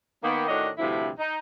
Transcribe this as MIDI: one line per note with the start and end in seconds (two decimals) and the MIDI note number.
0.23 0.44 51
0.23 0.44 58
0.23 0.44 59
0.47 0.68 45
0.47 0.68 51
0.47 0.68 62
0.47 0.68 66
0.47 0.68 73
0.47 0.68 75
0.78 1.08 38
0.78 1.08 43
0.78 1.08 48
0.78 1.08 53
0.78 1.08 64
1.18 1.36 63